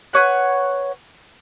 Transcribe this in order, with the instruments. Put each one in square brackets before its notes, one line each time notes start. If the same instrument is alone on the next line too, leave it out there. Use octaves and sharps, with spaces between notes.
[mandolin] B4 C#5 F#5